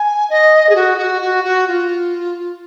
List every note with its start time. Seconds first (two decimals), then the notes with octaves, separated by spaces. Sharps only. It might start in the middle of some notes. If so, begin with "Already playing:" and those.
Already playing: G#5
0.30 D#5
0.69 G#4
0.75 F#4
0.98 F#4
1.22 F#4
1.44 F#4
1.68 F4